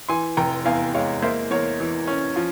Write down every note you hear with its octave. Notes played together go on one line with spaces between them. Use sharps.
E3 G#5 C6
F1 G5 A#5
E2 F5 G#5
G#3 C#5 F5
A#3 C5 E5
E2 A#4 C#5
E3
C#4
F3